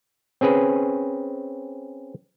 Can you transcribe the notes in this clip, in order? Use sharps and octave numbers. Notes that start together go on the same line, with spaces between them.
C4 C#4 G#4 B4